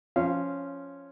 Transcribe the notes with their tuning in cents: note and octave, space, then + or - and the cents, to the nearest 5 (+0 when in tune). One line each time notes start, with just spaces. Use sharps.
F3 +0 C#4 +0 F5 -25